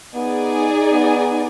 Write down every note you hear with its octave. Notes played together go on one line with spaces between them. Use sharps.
B3 D#4 G#4 D5 G#5
B3